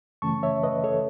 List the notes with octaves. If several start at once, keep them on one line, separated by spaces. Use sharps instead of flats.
F#2 C#3 E3 A3 C#4 A5 C#6
C#5 E5
B4 D#5
A4 C#5